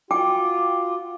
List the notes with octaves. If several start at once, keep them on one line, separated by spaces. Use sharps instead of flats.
F4 F#4 G5 D6